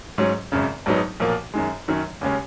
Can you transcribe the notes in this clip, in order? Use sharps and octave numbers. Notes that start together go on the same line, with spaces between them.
G#2 F#3 C#4
G#1 F#2 C#3
A#1 G#2 F#3 B3 D#4
B1 A#2 F3 A#3
F#2 D#3 G#3
F#2 D#3 F#3 C#4
D#2 C#3 G#3 C#4